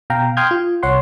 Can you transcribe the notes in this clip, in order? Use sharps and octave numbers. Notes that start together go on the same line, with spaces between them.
B2 F5 G5 A#5
G5 C6 D#6 F6 G6 G#6
F4
C2 C#5 F#5 C6